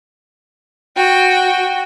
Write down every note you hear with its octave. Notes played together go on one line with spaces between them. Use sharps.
F#4 G5